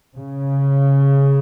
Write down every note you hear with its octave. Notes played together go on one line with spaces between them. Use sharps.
C#3